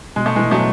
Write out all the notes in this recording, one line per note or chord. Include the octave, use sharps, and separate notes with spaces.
B2 G#3
A3
E3 G#3
B2 F#3 A3